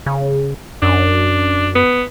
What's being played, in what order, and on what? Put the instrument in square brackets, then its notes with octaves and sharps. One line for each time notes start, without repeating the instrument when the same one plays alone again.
[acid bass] C#3
[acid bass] F#2 [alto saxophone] D4
[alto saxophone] B3